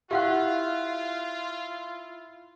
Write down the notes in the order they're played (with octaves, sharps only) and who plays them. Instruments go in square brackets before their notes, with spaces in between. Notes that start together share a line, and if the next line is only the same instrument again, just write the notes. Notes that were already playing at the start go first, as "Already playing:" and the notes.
[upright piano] E4 F#6 [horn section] F4 [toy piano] G4 F5 F#5